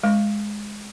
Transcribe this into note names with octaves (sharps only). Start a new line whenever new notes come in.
G#3